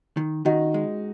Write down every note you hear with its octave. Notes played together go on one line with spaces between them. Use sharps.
D#3
D#3 D#4 F#4
G#3